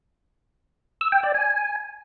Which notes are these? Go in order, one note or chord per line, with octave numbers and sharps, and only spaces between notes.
E6
G5
D5
G#5